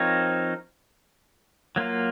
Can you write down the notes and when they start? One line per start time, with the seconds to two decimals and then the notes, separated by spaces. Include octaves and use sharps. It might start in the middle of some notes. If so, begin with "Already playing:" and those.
Already playing: F3 C4 D#4 A#4 C#5
1.76 F#3 A#3 F4